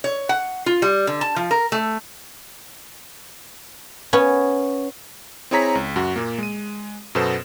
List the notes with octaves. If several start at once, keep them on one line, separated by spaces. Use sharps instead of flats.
C#5
F#5
F4
G3
D3
A5
F3
A#4
A3
B3 C#4
C4 E4 G#4 C#5 A#5 B6
C#2
F#2 F#4
A#2 A#3
G#3 D#7
F#2 B2 B3 A4 C5 E7